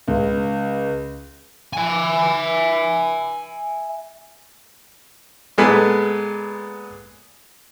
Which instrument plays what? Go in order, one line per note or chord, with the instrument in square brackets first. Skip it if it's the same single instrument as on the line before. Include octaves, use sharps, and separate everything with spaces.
[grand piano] C#2
[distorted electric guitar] E5 G#5
[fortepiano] A#2 G#3 B3 A4 B4